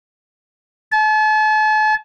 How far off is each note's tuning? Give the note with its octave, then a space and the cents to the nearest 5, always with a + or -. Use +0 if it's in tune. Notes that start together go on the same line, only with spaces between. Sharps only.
A5 -40